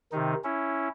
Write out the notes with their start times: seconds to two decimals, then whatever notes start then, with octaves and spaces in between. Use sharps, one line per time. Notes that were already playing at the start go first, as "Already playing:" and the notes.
0.12 C3 D#3 D#4
0.44 C#4 E4